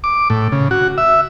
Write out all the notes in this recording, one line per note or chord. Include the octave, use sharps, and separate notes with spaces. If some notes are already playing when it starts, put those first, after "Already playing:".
D6
A2
C#3
F#4
E5